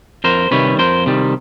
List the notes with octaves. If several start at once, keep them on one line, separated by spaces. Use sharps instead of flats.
F2 A#4 C5
C3 D#3 G3 B4 C#5
F2 A#4 C5
C3 D#3 G3